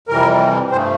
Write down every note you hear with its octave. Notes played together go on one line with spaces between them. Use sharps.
F2 C3 E3 G3 A#4
G2 F3 A3 C5